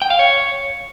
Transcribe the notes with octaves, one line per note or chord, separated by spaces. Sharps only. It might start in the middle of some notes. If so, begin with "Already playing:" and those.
G5
F5
C#5